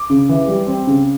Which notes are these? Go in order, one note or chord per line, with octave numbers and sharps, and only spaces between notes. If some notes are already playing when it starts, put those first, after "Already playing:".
Already playing: D6
C#3
E3
G3
C4
C#3